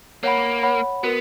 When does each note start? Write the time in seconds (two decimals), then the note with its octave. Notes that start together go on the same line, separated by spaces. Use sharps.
0.23 A#3 C#5 F#5 B5
0.63 C#5 F#5 B5
1.03 B3 F#4 A#4